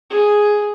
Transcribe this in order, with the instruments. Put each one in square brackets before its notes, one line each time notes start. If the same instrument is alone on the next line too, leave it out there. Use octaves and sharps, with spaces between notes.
[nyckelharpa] G#4